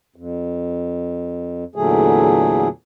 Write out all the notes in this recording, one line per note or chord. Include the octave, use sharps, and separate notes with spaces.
F2
E2 A#2 D3 F#3 A3 G#4